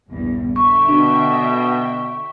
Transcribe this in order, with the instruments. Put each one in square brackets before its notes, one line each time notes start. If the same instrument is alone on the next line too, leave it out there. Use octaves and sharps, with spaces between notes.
[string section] A#1 E2 G2
[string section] D3 E5 G5 [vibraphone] C#6
[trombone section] B2 [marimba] D4